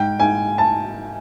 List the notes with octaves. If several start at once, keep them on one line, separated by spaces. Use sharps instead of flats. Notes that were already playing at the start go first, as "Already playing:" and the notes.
Already playing: G#2 G5
G#2 G#5
A5